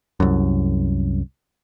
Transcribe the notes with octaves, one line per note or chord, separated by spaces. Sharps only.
C2 F#2